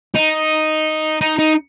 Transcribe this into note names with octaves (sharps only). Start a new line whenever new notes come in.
D#4
D#4
D#4